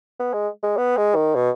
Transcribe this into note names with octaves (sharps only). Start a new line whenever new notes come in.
B3
G#3
G#3
B3
G#3
D#3
B2